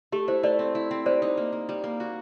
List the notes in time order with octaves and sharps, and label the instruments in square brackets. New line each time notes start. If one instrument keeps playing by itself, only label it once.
[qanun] A3 [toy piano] G4
[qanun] E4 [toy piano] C5
[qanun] A3 [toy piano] C5 D5
[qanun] C4
E4
C4
[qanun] G3 [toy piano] C5 D5
[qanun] D#4
A#3
A#3
G3
A#3
F#4